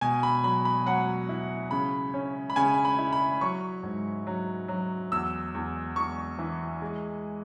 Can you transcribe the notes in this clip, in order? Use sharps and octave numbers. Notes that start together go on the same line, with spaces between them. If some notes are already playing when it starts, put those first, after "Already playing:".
B2 G#5
B5
F#3 B5
B5
F#3 F#5
E4
C#3 B5
C#4
B5
C#3 G#5
B5
E4
B5
F#3 C#6
G#2
F#3
F#3
E2 E6
E2
E2 C#6
E3
G#3